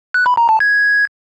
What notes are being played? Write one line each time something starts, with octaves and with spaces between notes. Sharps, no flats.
F#6
B5
A#5
A5
G#6